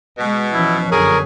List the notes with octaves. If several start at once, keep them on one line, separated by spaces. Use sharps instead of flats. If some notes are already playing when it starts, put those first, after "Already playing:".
B2 G#3
E3 F3 C#4 E4
F#2 B2 D3 G#4 A#4 C#5